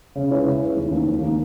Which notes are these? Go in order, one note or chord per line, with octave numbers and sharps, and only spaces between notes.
C#3
G#3 C#4 E4 B4
C#3
G#3 C#4 E4 B4
D#2
D#3 A#3
D#2
D#3 A#3